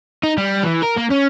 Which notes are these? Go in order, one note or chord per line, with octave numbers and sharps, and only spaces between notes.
D#4
G3
E3
A#4
A#3
C#4